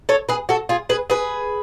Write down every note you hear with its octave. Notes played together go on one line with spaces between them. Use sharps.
A4 C#5
G#4 B4
F#4 A4
F4 G#4
G#4 B4
G#4 B4